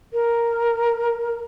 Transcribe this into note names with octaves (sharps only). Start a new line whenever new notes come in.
A#4